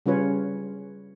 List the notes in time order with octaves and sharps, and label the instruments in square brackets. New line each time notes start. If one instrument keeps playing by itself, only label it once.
[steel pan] C#3 G3 C#4 F4 B4 C#5